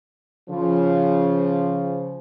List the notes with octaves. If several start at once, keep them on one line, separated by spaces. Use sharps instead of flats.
C#3 F3